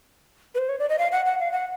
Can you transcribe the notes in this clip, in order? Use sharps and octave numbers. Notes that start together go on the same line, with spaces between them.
B4
C5
C#5
D5
D#5
F5
F#5
F#5
F5
F#5